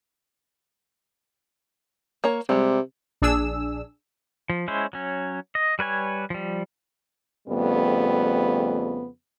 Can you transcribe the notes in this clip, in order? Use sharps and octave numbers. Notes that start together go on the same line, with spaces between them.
A#3 C#5 A#5
C3 G3 G#3
A#1 D4 G#4 E6
F3
G#3 C#4 E4 C5
F#3 C#4
D#5
G3 B4 C#5 G#5
F3 G3
F2 C#3 G3 A3 B3